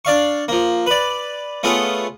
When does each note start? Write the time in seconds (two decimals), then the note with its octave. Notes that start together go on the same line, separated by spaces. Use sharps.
0.05 D4 D5 F5 C#6
0.48 F3 A#3
0.86 B4 D5
1.63 A3 B3 F4 G#4 A4 C#5